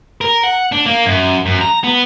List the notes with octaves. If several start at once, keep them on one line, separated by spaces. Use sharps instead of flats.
A#4
F#5
D4
A#3
F#2
F#2
A#5
B3